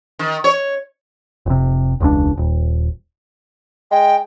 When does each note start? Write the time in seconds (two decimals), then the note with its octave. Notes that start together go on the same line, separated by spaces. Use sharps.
0.19 D#3
0.44 C#5
1.46 F1 C3
2.00 E1 C#2 D4
2.38 D#1
3.91 G#3 G5